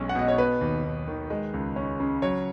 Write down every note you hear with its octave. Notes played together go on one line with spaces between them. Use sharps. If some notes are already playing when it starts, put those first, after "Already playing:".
Already playing: B1 G#3 C#4
F#5
B2 D#5
C#5
B3 B4
D#2
D#2
D#3
G#3
C#2
C#4
C#3
F#3 C#5